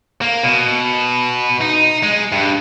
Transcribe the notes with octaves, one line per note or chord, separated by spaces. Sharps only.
A#3
B2
D#4
G#3
G2